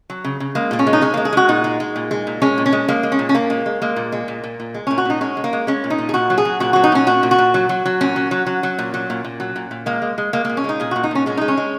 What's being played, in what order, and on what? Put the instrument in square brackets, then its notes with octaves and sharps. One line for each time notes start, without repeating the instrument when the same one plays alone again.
[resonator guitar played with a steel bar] F#3
C#3
C#3
G#3 A#3
A#2 A#3
C#4
G#3
D#4
G#3 C#4
G#3 A#3
G#4
G#3 F#4
A#2 D#4
G#3
G#3
A#2
G#3
A#2
G#3 C#4
A#2
C#4
G#3
G#3 A#3
G#3
C#4
A#2
C#4
A#2 A#3
G#3
G#3
G#3 A#3
A#2
G#3
A#2
A#2
A#2
G#3
A#2 C#4
F#4
A#2 D#4
G#3 C#4
G#3
A#3
G#3
G#3 C#4
A#2
D#4
A#2
G#4
A#2 F#4
F#3
G#4
F#3
A#2 F#4
F#3 F#4
D#4
A#2 C#4
A#2 F#4
A#2
F#4
A#2
F#3
F#3
F#3
A#2 C#4
F#3
F#3
F#3
F#3
A#2
F#3
A#2
A#2
F#3
A#2
A#2
G#3 A#3
G#3
G#3
G#3 A#3
A#2 A#3
C#4
G#3 D#4
A#2 G#4
A#2 F#4
D#4
A#2 C#4
G#3 C#4
G#3 D#4
C#4
G#3